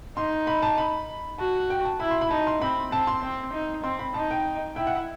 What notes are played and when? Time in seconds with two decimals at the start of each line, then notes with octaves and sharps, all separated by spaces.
0.17 D#4 C6
0.47 B5
0.62 A5
0.78 B5
1.38 F#4 A5
1.70 G5
1.85 A5
2.00 E4 B5
2.11 C6
2.21 B5
2.30 D#4 A5
2.47 C6
2.62 C4 B5
2.92 C4 A5
3.07 C6
3.22 C4
3.53 D#4
3.84 C4 C6
3.99 B5
4.14 D#4 A5
4.31 G5
4.76 E4 G5
4.87 F#5